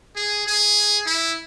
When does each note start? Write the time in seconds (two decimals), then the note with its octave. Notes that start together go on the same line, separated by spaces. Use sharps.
0.16 G#4
0.47 G#4
1.06 E4